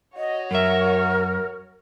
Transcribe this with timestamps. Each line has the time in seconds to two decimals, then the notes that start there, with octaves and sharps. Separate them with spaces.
0.17 F#4 C#5 D#5
0.51 F#2 A#4 E5